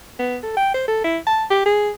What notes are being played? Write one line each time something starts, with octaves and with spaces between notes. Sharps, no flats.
B3
A4
G5
C5
A4
E4
A5
G4
G#4